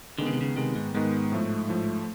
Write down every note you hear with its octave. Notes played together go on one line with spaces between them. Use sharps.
D3 D#3 G#3 B3
C#3
C3
C#3
C3 D#3 G#3 B3
G#2
G#2 D#3 G#3 B3
A2 F3 A3
A2 F3 A3